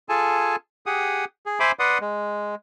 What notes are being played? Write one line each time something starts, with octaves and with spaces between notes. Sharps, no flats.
F4 G#4 A4 G#5 A5
G4 G#4 F#5 D#6
G#4
C5 E5 G#5 B5 C6 D6
B4 D5 F#5 C6 D#6
G#3